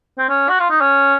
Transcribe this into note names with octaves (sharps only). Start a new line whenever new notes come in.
C4
C#4
F#4
F4
D#4
C#4